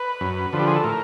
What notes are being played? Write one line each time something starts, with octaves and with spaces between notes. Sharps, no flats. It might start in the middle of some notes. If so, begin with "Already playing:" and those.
Already playing: B4
F#2
D3 F3
G4
G#4
A4
A2 A#4